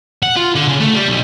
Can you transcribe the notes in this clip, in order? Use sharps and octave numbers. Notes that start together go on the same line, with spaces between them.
F#5
F4
D3
C#3
A3
G3
B1